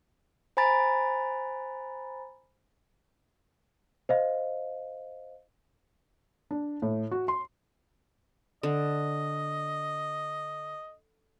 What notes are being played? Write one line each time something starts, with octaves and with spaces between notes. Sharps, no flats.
C5 G#5 A#5 B5 A6
C5 D#5 F5
D4
A2
F#4
C6
D3 D#5